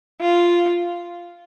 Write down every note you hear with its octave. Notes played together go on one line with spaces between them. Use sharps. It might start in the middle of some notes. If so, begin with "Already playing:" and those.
F4